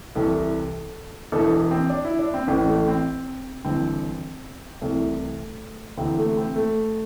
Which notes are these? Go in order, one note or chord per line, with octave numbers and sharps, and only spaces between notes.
C2 C3 E3 A4
E1 E2 E3 A4
C4
D4
E4
D4
C4
A1 A2 E3 C4
A3
C4
G1 G2 E3 C4
C2 C3 E3 A3
D2 C3 E3 C4
A3
C4
A3